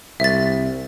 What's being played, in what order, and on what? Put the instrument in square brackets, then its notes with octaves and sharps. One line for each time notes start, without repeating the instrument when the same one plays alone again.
[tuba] C2 [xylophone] E5 A6